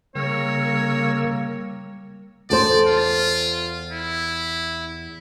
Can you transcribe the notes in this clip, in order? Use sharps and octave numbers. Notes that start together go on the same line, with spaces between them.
C#3 G3 A#3 A#4 C#5 E6
E2 A4 C5 D5
F4
E4